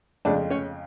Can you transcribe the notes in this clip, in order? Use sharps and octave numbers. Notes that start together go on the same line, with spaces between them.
F2 C#3 G#3 D4 D5
C#4 C#5